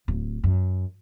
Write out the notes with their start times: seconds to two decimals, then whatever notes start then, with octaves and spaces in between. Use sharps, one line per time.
0.08 D1
0.44 F#2